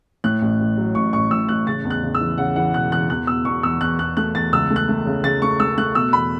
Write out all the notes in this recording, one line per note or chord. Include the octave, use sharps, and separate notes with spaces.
A2 F#6
A1
A1
F#3
A1 C#6
A1 C#6
A2 E6
A1 F#6
C#3 A6
E2
F#6
C#3
E6
E3
C#3 F#5
E3 F#5
E1 F#6
E2 F#6
E2 F#6
B2 E6
E2 C#6
E2 E6
E2 F#6
E2 F#6
A3 F#6
E2 A6
C#2 E6
A3
F#6
A3
C#3
C#3 A6
A3 C#6
A3 E6
A3 F#6
B2 E6
E2 B5